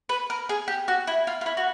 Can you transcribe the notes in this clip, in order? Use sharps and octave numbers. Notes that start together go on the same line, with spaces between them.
B4
A#4
G#4
G4
F#4
E4
F4
F4
E4
F#4